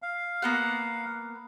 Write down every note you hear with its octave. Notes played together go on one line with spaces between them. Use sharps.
F5
A#3 B3 F#5